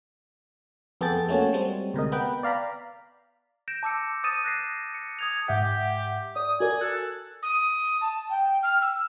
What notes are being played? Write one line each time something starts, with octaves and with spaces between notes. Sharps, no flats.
F2 B3 G#4 A4 G5 A6
A3 A#3 C#4 F#4 C#5 A5
G3 G#3 C4
D2 C3 A#4 D#5
B3 B4 G5
D5 F5 A#5 B5
G6 A#6 D7 E7
A5 D6 E6 C#7
D#6 G6 A6 D#7 E7
F#6 A#6 C7
C#7
D#6 G#6 F7
G#2 G4 E5 F#5
D5 D#6
F#4 A#4 D5 G#5
A4 F#6
D#6
A5
G5
F6
E6